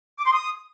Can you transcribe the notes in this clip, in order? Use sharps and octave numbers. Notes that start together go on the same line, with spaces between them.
D6
C6
D#6